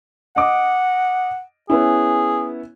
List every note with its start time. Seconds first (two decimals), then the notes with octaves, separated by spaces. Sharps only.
0.36 D#5 F#5 D6 D#6
1.70 B3 C#4 E4 G#4